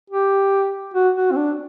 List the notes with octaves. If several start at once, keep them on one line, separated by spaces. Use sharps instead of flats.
G4
F#4
F#4
C4
D4